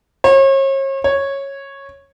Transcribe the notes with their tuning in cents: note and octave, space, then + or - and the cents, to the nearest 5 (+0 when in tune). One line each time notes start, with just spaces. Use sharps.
C#5 -40
C#5 -10